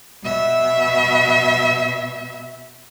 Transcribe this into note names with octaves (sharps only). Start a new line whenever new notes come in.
B2 E5